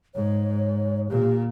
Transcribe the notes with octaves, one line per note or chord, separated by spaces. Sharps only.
G#2 C#5
A#2 G4